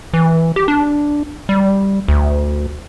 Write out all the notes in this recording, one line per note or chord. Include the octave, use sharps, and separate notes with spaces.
E3
G4
D4
G3
D2